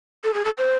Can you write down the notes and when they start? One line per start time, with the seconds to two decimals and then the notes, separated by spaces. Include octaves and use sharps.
0.24 A4
0.34 G#4
0.45 A4
0.58 C5